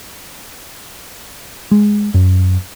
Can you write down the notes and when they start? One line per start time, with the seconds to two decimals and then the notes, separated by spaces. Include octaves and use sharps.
1.71 G#3
2.14 F#2